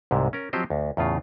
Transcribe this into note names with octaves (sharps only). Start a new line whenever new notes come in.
C2 G#2 C3
C#4 A#4
F3 F#3 C4 G4 C5 D#5
D2
E2 A2 C#3 F4